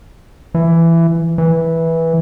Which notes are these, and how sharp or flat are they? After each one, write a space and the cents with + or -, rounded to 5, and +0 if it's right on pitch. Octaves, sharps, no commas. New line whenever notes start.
E3 +15
E3 -10